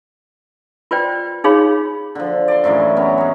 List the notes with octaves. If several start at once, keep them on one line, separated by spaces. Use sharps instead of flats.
F4 B4 C5 D5 G5
D#4 G#4 C#5 F5 B5
D3 F3
D5 C6
F#2 A2 E3 G#3
B3 C#4 A#5
G#3 C#5